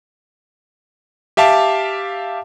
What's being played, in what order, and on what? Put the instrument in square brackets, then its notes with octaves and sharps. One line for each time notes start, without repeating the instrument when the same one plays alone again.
[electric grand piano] G4 E5 F5 A5 D6